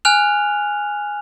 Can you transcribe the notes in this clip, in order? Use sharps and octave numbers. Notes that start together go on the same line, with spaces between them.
G#5 F6 F#6 F7